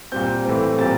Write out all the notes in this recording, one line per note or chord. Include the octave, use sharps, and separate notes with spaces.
A#2 G3 C4 G6
A2 E3 A3 C4
A#2 G3 C4 A6